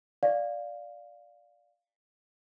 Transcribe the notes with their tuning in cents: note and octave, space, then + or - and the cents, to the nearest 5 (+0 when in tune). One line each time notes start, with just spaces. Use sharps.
D5 +0 F5 +5